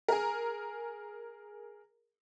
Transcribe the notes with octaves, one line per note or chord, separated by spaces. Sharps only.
G#4 A#4